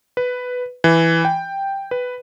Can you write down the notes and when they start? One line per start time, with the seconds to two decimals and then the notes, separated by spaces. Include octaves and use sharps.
0.17 B4
0.84 E3
1.25 G5
1.91 B4